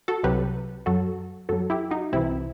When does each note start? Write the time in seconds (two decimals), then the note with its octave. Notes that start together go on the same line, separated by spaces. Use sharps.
0.08 F#4 A4
0.23 C2 C3 F#3 G4 B4
0.86 F#2 F#3 F#4 A4
1.49 F#2 F#3 F#4 A4
1.70 E4 G4
1.91 D#4 F#4
2.12 C2 C3 E3 C4 E4